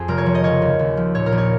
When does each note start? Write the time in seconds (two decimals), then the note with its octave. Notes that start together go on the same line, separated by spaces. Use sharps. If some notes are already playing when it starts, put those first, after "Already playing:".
Already playing: F2 G#4
0.08 F1 A#4
0.18 C#5
0.26 F3
0.35 D#5
0.44 C#3 C#5
0.62 D#2
0.79 D#2
0.97 F3
1.15 A#2 C#5
1.26 A#4
1.32 A#1
1.38 C#5